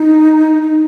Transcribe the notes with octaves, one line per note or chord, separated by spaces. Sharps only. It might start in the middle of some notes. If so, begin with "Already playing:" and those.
Already playing: D#4
D#4